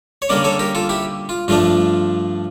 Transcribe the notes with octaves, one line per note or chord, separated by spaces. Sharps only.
C#5
D3 G3 A#3 C#4 A#4 D5
A4 C#5
G4 A#4
F4 A4
E4 G4
F4
G2 F3 A3 D4 F4